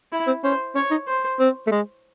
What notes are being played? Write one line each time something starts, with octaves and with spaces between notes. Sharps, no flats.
E4
C4
C#4 C5
C#4 C#5
D#4
C5
C4
A3
G#3